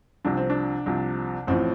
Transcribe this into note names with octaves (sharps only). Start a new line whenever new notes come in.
C2 C3 F3 D4
C4
D4
C2 C3 F3
A1 A2 F3 C4